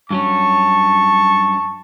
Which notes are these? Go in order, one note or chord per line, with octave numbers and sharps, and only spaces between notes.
G2 F#3 C#4 A5 C#6